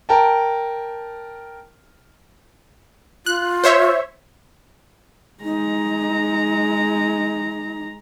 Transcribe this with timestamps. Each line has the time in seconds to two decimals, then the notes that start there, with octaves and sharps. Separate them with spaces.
0.09 A#4 G5 A5
3.26 F4 F#6
3.64 C5 C#5 E5
5.44 G#3 D#4 A#5